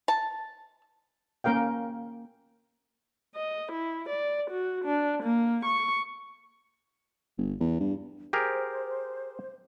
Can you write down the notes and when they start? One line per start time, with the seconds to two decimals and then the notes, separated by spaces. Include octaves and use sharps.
0.08 A5
1.44 A#3 C#4 A#4 F5 G5
3.35 D#5
3.72 E4
4.09 D5
4.51 F#4
4.85 D4
5.23 A#3
5.65 C#6
7.37 G1
7.60 E2
7.80 G2
8.33 G4 G#4 A#4 C5